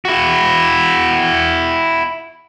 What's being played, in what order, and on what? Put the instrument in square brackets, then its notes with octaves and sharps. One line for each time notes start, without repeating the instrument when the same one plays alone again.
[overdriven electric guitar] E4 F#4